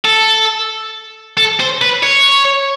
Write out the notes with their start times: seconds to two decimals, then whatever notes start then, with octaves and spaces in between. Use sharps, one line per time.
0.05 A4
1.37 A4
1.60 C5
1.82 B4
2.03 C#5